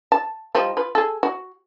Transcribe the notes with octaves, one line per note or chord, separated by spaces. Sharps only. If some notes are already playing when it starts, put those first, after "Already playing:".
A5
F3 G3 D#4
F4 B4
G#4 A4
F#4